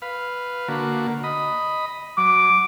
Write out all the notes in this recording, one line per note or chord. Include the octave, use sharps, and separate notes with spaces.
B4 F5
D3 A#3 F#4
D#5 B5
F#3 D6